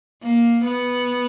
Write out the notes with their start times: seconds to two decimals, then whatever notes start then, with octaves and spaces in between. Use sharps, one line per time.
0.23 A#3
0.64 B3